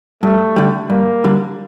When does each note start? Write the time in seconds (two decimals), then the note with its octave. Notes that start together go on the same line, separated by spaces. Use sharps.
0.23 G2 A3
0.56 D3 G3
0.90 G2 A#3
1.24 D3 G3